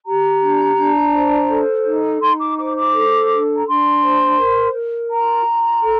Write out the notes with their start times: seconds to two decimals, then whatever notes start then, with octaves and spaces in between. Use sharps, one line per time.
0.05 G4 A#5
0.41 D4
0.76 D4
1.13 C5
1.49 A4
1.85 D#4
2.21 D#4 C6
2.39 D6
2.57 C5 D6
2.75 D6
2.93 A4
3.29 D4
3.56 A#5
3.65 D4 C6
4.02 C5
4.38 A#4
4.73 A#4
5.10 F4 A#5
5.46 F4
5.82 A4